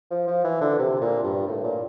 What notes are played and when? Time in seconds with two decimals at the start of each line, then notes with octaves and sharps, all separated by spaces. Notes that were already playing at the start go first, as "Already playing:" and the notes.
0.10 F3
0.27 F3
0.44 E3
0.61 D3
0.78 C3
1.01 A#2
1.23 G2
1.47 A2
1.64 A#2